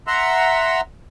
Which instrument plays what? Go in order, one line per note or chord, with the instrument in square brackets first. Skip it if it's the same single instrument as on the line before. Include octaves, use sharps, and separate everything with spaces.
[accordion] E5 F#5 A#5 C6 E6